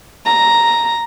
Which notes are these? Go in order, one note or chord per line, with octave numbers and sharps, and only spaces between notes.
A#5